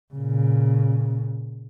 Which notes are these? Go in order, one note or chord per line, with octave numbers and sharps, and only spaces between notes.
A#2 C#3